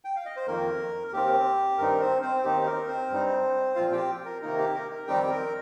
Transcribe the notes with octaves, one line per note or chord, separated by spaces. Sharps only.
G5
F5
D#5
C5
F2 D#3 A#3 A#4
A#4
D#2 D#3 C4 G4
G2 D#3 C4 D#4 A#4
C4 C5
C4 C5
D#2 D#3 C4 D#4 G4
A#4
C4 C5
G2 G3 D#4
A#2 F3 C4 F4 F5
G4 G5
A#4
C3 D#3 A#3 D#4 A#4
G4
A#4
A#4
F2 D#3 G3 C4 D#4 G4 G5
G4
A#4